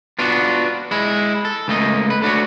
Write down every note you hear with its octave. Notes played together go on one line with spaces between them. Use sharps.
B3 D4 F4 F#4
G#3 E4
A4
C#2 A3 A#3 D#5
B4
A3 D4 F#4 C#5